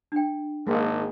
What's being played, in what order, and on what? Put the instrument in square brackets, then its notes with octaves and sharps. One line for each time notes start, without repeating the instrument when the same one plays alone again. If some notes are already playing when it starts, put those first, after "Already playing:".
[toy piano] D4 G5
[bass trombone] G#1 [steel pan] G#3 A#3